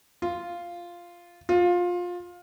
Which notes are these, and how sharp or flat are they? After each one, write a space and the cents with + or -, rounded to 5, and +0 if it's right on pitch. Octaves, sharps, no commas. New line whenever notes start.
F4 -5
F4 +20